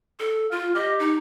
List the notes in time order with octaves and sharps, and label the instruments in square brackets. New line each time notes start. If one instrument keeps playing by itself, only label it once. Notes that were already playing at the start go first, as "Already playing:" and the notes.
[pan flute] A4
[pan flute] F4 [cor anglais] F5
[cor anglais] G4 [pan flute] D#5
[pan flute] D#4